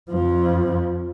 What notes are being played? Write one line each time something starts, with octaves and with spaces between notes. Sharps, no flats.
F2 F3